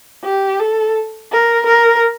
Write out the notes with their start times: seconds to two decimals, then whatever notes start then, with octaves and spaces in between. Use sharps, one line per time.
0.25 G4
0.60 A4
1.32 A#4
1.66 A#4